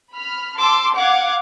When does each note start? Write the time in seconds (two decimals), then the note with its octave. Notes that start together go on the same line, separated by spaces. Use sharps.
0.14 B5 F6
0.58 A5 C6 D6 E6
0.98 F5 F#5 D6 G#6